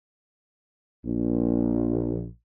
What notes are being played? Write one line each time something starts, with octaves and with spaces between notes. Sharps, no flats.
A#1